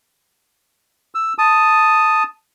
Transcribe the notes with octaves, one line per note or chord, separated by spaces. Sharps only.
E6
A5 D#6